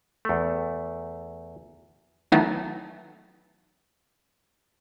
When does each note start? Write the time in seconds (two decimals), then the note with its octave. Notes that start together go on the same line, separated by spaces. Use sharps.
0.25 E2 A3
2.32 D#3 E3 F#3 A3 B3 D#4